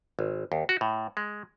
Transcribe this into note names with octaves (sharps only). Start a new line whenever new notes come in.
G#1
D#2
F#4
A2
G#3